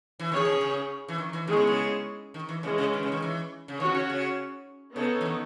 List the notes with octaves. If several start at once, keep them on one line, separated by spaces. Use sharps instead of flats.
E3
D#3 C#4 G#4 C#5
B2
C#3
E3
D#3
E3
D#3 G#3 B3 E4 G#4 C#5
C#3
C#3
D#3
E3
C#3 E3 G#3 C#4
C#3
D#3
C#3
D#3
E3
C#3
D#3 C#4 F#4 C#5
C#3
C#3
C#3 B3 D#4 A4 C#5
E3
D#3